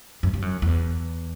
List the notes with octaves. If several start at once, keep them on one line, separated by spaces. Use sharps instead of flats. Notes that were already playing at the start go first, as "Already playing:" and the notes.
F#2
G2
F#2
E2